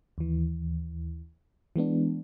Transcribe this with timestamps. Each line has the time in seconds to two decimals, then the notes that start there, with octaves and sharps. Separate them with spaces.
0.18 D#2 E3
1.76 E3 G#3 B3 D4